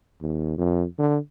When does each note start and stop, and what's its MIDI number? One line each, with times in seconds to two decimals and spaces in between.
0.21 0.56 39
0.58 0.84 41
0.98 1.17 50